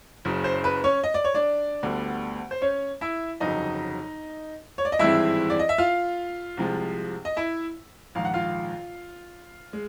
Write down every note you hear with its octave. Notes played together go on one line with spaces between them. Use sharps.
F#1 F#2 C#3
C5
B4
C#4 C#5
D#5
D5
C#5
D4 D5
D2 D3 G3 B3
C5
C#4 C#5
E4 E5
G1 F2 C#3 F#3 D#4 D#5
C#5
D5
D#5
G#1 G2 E3 G#3 C4 E4 E5
D5
D#5
E5
F4 F5
C2 C3 F3 G#3
D#5
E4 E5
A#1 G#2 D#3 F5
F#5
F4 F5
G#3